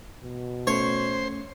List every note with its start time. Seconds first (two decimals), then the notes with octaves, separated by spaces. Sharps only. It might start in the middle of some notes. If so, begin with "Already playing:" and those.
0.24 B2
0.67 A3 C#4 C5 C#5